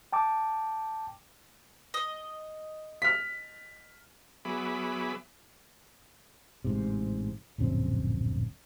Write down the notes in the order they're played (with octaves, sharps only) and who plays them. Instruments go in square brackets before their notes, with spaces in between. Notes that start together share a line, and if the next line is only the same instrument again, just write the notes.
[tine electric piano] G5 A5 D6
[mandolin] D#5
[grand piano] F6 B6
[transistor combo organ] F#3 B3 G#4 E5 B5 D6
[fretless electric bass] A1 G#2 C3
D1 A#1 F#2 C4